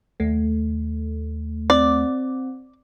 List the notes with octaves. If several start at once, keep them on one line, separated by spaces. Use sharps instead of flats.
D#2 A3
C4 D5